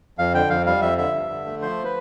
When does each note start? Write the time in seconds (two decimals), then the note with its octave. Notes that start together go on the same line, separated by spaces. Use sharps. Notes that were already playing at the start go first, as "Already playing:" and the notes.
0.18 F2 F5
0.34 D3 G5
0.50 F2 F5
0.66 G3 F5
0.81 F2 E5
0.98 D3 E5
1.14 G2
1.30 D3
1.45 A3
1.62 F3 C5
1.85 B4